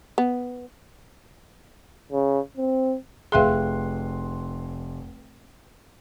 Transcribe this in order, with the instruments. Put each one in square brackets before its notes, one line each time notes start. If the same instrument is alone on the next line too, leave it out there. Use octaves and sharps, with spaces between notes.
[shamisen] B3
[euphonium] C#3
C4
[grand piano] F1 C6 [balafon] G#4 E5 F5 [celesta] B4 G5 F#6